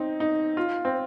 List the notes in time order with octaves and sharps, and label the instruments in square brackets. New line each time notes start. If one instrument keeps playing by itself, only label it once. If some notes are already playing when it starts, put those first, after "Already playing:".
Already playing: [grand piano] C4 D#4
D#4
F4
C4